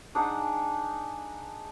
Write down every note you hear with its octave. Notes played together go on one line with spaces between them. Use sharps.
D4 D#4 G#4 F#5